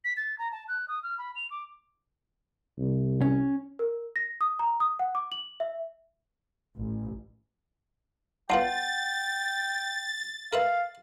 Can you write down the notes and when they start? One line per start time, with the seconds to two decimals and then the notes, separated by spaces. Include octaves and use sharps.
0.04 B6
0.17 A6
0.39 A#5
0.52 A5
0.68 F#6
0.88 D#6
1.03 F6
1.18 B5
1.36 F7
1.51 D6
2.78 C2
3.21 C#4
3.79 A#4
4.16 A#6
4.41 D#6
4.59 A#5
4.80 D#6
4.99 F#5
5.15 D6
5.32 F#7
5.60 E5
6.77 A1
8.50 B3 F4 F#5 G5 A5 A#5 A6
10.53 A#4 B4 E5 F5